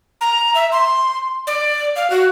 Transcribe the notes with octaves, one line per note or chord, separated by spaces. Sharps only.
A#5
E5
C6
D5
F5
F#4